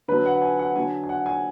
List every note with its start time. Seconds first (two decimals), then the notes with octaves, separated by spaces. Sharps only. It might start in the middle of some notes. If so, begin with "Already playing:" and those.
0.08 D3 F#3 B4
0.26 F#5
0.42 G#5
0.59 F#5
0.76 D3 F#3 G#5
1.03 G#5
1.09 F#5
1.26 G#5